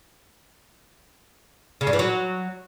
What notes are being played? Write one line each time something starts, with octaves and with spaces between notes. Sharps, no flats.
C#3
G2
E3
F#3